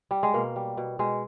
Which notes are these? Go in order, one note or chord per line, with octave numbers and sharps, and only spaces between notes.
G3
G#3
B2 A#3
G3
B2
B2 G#3